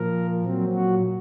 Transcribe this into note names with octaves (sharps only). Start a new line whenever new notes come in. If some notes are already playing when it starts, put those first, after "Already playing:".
Already playing: A#2 F3 A#4
A#2 F#3 C4
F#4